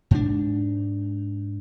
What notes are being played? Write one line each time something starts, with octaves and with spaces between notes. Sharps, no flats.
G#2 D4